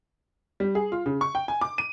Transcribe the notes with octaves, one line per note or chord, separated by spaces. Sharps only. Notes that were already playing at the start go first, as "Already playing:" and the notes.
G3
G#4
F4
C#3
C#6
G5
G#5
D6
D#7